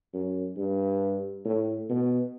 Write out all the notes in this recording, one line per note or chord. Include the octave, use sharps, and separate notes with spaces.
F#2
G2
A2
B2